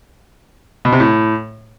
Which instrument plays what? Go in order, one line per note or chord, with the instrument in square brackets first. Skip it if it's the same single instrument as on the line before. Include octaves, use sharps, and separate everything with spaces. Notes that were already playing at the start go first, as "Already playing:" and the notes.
[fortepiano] B2
C3
A2